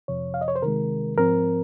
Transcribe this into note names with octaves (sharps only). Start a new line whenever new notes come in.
F2 C3 F3 C#5
F5
D#5
C#5
C5
C3 D#3 G#3 A#4
G#2 F3 C4 A#4